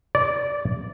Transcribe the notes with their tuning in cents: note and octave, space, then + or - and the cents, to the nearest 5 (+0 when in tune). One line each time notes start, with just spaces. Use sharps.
D5 -15